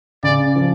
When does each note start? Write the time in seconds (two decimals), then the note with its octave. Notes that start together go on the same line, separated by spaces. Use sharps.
0.23 C#3 D5
0.56 F3